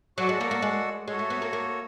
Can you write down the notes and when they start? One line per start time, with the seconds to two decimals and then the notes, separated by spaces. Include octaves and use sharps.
0.17 F#3 F#4 A4 D5 F#5
0.29 G#3
0.41 A#3
0.51 A#3
0.62 G#3
1.08 G#3 F#4 A4 C#5
1.19 A3
1.30 B3
1.42 A#3
1.53 A#3